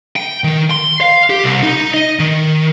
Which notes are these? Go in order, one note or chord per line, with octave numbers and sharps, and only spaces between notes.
G5
D#3
C6
F5
G4
C2
D#4
D#5
D#3